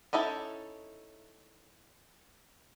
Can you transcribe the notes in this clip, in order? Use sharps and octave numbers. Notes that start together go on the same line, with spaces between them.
C#4 D#4 E4 A4